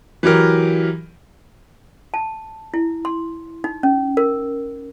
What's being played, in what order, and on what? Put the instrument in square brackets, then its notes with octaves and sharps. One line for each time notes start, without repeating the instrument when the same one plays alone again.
[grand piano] E3 F#3 G4 A#4
[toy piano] A5
E4
C6
D#4
C#4
A#4